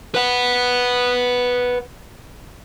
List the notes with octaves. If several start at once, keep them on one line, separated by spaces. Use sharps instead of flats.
B4 F#5